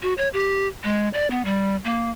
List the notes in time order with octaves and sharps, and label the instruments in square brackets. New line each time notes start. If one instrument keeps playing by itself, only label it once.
[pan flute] F#4
C#5
G4
G#3
D5
B3
G3
A#3